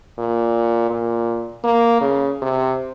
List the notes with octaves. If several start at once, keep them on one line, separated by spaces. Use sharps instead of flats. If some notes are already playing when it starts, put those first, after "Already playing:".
A#2
A#2
A#3
C#3
C3